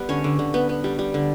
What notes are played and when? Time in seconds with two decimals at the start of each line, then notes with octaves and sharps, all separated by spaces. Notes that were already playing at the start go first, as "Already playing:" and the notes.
Already playing: G3 B3 B4
0.09 D3 C#4 C#5
0.24 D3
0.39 D3
0.54 B3
0.69 B3
0.84 G3
0.99 G3
1.14 D3